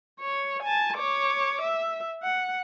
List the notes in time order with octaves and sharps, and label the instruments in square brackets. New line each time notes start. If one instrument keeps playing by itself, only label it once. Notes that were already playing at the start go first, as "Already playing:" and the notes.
[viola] C#5
G#5 A5
C#5 D6
E5
F#5